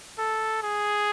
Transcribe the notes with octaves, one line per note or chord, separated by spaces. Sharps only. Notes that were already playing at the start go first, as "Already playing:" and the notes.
A4
G#4